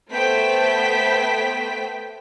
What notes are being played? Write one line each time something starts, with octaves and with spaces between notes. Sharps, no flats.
A3 B3 C5 G5 B6